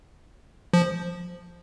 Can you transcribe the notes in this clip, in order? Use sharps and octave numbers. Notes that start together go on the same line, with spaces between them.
F3